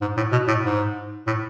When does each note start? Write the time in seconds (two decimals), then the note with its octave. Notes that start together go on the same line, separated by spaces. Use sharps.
0.01 G#2
0.17 A2
0.32 B2
0.48 A2
0.63 G#2
1.27 A2